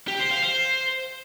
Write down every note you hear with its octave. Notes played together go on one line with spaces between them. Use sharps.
G4
C5
F5
C5